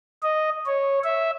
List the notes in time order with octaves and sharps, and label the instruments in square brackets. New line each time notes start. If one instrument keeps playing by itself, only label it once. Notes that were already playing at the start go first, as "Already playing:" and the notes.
[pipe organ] D#5
C#5
E5